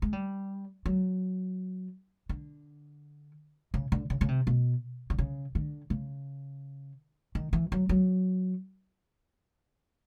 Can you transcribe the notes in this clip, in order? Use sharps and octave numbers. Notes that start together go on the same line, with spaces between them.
G#3
G3
F#3
D3
C#3
D3
C#3
C#3
C3
B2
D3
C#3
D3
C#3
D#3
E3
F#3
F#3